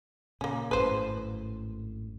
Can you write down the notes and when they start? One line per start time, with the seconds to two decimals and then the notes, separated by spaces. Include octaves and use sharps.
0.41 A#2 C#3 A#3 C#4
0.71 G#1 F#2 A2 B4 C5